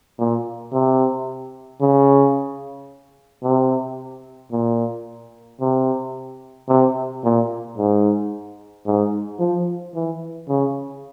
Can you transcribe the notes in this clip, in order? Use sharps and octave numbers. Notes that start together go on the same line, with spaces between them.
A#2
C3
C#3
C3
A#2
C3
C3
A#2
G#2
G#2
F3
E3
C#3